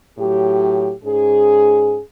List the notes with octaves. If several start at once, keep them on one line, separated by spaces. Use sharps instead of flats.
A2 F#3 G4
G#2 C#4 G#4